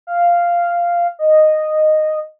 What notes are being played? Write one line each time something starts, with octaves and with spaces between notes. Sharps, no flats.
F5
D#5